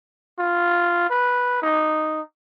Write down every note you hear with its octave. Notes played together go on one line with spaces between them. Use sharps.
F4
B4
D#4